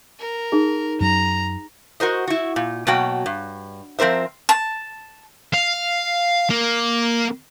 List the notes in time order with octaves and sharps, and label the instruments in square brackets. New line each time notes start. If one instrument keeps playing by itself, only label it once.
[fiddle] A#4
[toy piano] D#4 G#4
[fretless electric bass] F#2 F#3 [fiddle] A#5
[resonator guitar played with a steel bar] F#4 A#4 C5 D#5
E4 F#4
A#2
B2 F#3 A#3 F#4 G5
G2
F3 C4 A#4 C5 E5
[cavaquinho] A5
[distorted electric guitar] F5
A#3